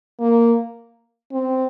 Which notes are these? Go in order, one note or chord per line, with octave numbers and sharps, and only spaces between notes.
A#3
C4